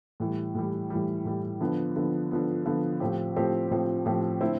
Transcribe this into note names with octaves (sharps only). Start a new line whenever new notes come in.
A2 E3 G3
A2 E3 G3
A2 E3 G3
A2 E3 G3
D3 F3 B3
D3 F3 B3
D3 F3 B3
D3 F3 B3
A2 F3 C4 G4
A2 F3 C4 G4
A2 F3 C4 G4
A2 F3 C4 G4
D3 A3 C4 E4